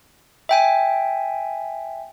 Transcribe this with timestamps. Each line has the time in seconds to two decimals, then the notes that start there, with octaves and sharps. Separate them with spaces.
0.49 E5 G5 G#5